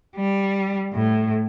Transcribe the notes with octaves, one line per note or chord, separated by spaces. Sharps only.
G3
A2